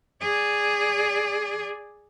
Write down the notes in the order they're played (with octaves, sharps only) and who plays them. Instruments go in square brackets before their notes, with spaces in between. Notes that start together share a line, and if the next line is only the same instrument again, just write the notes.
[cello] G#4 D5